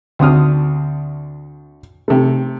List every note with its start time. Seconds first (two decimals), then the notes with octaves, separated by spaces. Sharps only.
0.19 D2 C4 D4 D#6 F6
2.08 C3 A3